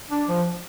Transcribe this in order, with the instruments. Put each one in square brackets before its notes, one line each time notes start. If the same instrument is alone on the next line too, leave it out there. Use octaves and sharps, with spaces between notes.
[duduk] D4
F3